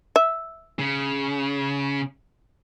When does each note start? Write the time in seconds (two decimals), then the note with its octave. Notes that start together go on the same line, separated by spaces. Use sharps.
0.16 E5
0.79 C#3